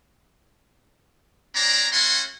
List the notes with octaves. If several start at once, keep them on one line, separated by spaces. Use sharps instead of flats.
C4 D4 C#5 D5 A#5
A3 C#4 F#4 F#5 G#5 C6